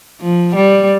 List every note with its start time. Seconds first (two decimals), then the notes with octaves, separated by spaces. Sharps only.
0.21 F3
0.56 G3